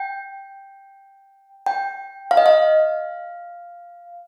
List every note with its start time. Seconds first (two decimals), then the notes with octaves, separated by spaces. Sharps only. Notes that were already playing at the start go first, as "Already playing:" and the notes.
Already playing: G5
1.66 G5
2.31 F5
2.37 D#5
2.46 F5